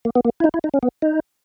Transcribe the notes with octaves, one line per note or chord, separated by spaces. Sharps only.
A#3
B3
A#3
E4
D#4
E4
D#4
C#4
B3
D#4